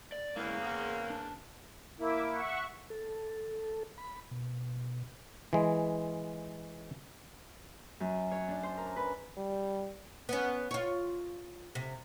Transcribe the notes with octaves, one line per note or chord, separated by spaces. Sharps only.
D5
E2 C#3 G#3 A#3 E4
G#4 F#5
D4
A#3 E4 E5 D6
E5 F#5 C#6
A4
B5
B2
E3 G#3
F#2
C#5
D4
C5
A#4
B4
G3
B3 C#4
F4 C#5
C3